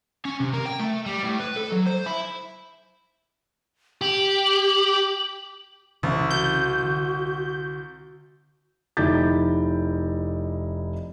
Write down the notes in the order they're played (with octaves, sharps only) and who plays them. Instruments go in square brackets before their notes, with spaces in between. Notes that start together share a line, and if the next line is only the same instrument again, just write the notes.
[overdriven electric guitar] C#4
C3
A#3
G5
A3
G3
A2
B4
A4
F#3
C5
E4
[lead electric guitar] G4 [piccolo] F#7
[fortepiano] C2 [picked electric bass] C#3 E3 C#4
[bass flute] F#4 [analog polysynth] G6
[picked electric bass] D3
[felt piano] F1 D#4 E4 D6 G6 A6